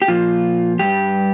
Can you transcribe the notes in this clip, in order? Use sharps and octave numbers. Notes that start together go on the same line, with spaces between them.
G4
A#2 F3 F4
G2 G3 G4